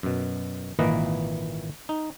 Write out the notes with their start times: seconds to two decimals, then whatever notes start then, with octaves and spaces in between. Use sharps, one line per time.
0.03 F#2 B2
0.79 G#1 A#2 E3 A#3 B4 D#5
1.89 D#4